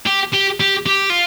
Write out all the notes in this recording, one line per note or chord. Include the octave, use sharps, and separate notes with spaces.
G4
G4
G4
G4
F4